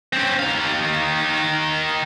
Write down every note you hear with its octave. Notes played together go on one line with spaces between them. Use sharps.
C4 C#4
D#3 F5